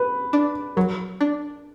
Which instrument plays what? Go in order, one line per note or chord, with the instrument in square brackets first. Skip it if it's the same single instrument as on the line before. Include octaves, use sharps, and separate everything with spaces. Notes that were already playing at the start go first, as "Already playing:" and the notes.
Already playing: [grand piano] B4
[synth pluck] D4
[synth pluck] F#3 [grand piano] A#4
[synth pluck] D4